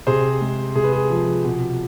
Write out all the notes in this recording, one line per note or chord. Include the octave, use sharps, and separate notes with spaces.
C3 G#4 C5
G#3
C3 G#4
B4
G#4
F3
B2